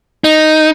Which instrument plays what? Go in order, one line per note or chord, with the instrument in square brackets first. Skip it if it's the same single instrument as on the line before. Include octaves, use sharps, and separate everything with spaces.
[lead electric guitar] D#4